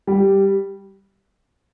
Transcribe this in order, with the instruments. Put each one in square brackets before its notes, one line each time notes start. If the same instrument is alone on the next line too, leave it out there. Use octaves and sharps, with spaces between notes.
[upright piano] G3